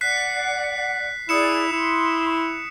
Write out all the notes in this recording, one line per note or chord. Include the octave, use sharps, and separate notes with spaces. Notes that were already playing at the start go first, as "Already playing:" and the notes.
D5 F#5 F#6 B6 C7
E4 G#4 D5 D#6 C#7 E7
E4 C6